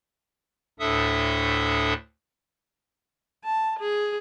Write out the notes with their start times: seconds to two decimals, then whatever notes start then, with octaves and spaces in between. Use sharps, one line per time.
0.79 D2 A2 D4 A4 E5 D#6
3.44 A5
3.79 G#4